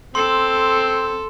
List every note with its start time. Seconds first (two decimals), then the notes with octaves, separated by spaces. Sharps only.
0.15 C4 A4 C6